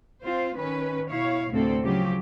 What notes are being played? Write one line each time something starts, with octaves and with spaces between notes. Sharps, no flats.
C4 F4 C5
D#3 C#4 B4
B2 E4 C#5 F5
D2 A2 C3 C4 A4
C#3 F3 F#3 G4